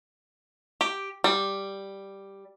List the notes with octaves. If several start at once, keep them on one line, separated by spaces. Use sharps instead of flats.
G4
G3